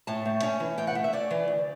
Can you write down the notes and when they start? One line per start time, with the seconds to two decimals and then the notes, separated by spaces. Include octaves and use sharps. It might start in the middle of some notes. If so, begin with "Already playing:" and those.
0.07 A2 A5
0.25 A3
0.43 C#4
0.60 E3
0.78 A2 G5
0.87 F#5
0.95 A3
1.04 E5
1.13 C#4 D5
1.31 E3
1.48 D2